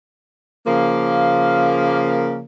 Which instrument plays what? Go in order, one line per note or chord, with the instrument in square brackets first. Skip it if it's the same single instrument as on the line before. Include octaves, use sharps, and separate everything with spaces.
[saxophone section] C#3 F3 A#3